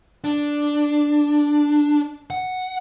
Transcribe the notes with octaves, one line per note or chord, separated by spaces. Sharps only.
D4
F#5